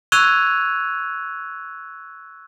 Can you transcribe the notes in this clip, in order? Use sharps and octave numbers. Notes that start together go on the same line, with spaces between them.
C#6 E6 F#6 G#6 D#7 F7